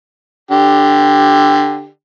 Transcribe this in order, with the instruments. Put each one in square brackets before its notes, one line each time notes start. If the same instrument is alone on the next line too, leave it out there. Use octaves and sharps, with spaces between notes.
[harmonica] D3 G4